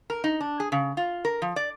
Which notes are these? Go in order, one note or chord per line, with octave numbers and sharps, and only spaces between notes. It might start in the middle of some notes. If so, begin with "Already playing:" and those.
A#4
D#4
D4
G#4
C#3
F4
A#4
F3
D5